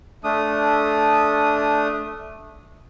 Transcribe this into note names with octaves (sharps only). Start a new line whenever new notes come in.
A3 D4 D#6